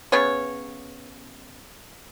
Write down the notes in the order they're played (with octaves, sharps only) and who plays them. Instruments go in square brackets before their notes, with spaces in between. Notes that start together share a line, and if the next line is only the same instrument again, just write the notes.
[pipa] C#3 B3 C#5